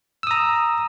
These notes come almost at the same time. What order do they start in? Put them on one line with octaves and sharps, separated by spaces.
E6 D#6 A#5